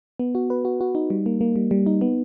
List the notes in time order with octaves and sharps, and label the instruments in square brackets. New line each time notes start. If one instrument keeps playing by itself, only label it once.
[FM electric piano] B3
F#4
B4
F#4
F#4
D#4
G3
A#3
A#3
G3
G3
D#4
B3